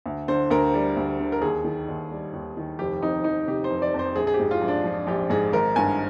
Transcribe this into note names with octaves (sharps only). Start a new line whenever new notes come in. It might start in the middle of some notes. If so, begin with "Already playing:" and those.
D2
D3 C5
D2 A#4
G3
D2
D3
A#4
D#2 G#4
D#3
D#2
G3
D#2
D#3
F1 G4
F2 D#4
F1 D#4
C3 G4
C5
F1
D5
F2
C5
A#1 G#4
G#4
G4
G#2
F4
A#1
D4
F3
A#1 G4
G#2 G#4
G#1 A#4
G2 G#5